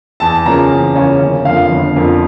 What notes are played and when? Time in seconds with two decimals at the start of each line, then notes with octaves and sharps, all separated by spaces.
0.20 E2 A5
0.46 C#3 F3 A#3 C#4 A#5
0.70 E2
0.95 C#3 F3 A#3 C#4
1.21 G1
1.45 F2 D3 F3 A#3 F5
1.71 G1
1.95 F2 D3 F3 A#3